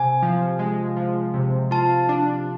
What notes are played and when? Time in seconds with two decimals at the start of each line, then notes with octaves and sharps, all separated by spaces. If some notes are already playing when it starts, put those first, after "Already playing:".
Already playing: C3 G#5
0.22 F3
0.59 G#3
0.97 F3
1.34 C3
1.71 F4 A5
2.09 D4